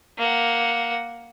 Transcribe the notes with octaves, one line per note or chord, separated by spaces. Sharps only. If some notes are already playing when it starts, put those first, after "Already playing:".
A#3 F#5